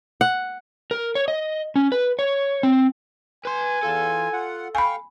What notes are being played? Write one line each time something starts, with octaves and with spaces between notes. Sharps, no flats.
F#5
A#4
C#5
D#5
C#4
B4
C#5
C4
B4 G#5 C6
E2 F4 A4
F4 F#5
F5 G5 G#5 B5 C#6